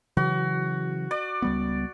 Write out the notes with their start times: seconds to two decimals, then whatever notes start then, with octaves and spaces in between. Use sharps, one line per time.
0.17 C#3 E3 F#3 F#4
1.11 D5
1.42 C#2 G3 B3